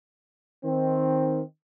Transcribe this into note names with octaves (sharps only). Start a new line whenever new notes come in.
D#3 C4